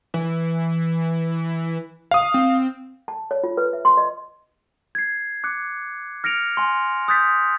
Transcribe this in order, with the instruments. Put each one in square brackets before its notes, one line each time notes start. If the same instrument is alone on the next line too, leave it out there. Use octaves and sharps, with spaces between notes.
[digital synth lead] E3
[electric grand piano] F5 D#6
[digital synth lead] C4
[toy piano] A5
C#5
F4
B4
E5
C6
D#5
[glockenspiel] G#6 C7
D6 F#6 C#7
F6 A#6 C#7 D7 F7
G#5 C6
D#6 F#6 G6 A6 B6